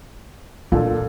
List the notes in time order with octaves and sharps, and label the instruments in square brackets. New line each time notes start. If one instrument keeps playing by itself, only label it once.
[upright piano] A#2 A4 [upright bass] D4